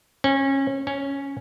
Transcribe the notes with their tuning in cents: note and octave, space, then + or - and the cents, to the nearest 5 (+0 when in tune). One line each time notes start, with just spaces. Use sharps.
C#4 -25
C#4 +0